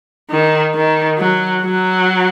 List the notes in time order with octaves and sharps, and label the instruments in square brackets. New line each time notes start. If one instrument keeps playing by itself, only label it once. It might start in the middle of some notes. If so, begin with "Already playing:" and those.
[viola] D#3
D#3
F#3
F#3